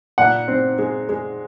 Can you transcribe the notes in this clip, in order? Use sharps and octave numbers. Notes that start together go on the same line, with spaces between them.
A#2 F#5
C4
G#3
G#3